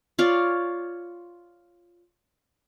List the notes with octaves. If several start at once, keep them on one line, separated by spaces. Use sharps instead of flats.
F4 C#5 D5